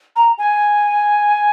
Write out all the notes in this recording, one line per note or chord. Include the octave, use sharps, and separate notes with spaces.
A#5
G#5